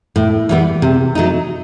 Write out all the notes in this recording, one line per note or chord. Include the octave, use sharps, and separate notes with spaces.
A2
E3 G3 B3
C3
F#3 A3 D#4